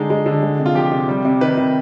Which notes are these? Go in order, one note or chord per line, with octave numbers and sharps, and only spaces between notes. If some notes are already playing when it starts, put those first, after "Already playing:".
Already playing: D3 G#3 D#4
G#3
D3
G#3
C3
F4
F3 G4
C3
G3
C3
D#3 B4
C3